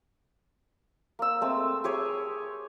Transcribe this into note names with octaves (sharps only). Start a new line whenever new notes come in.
A#3 E6
G#3 A3 C4
G4 G#4 C#5 G#5